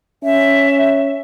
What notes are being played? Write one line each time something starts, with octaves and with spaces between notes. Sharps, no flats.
C#4 E5